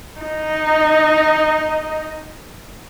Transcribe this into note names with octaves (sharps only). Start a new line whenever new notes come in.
D#4 D#5